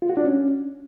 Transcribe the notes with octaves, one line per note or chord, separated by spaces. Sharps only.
F4
F#4
D4
C#4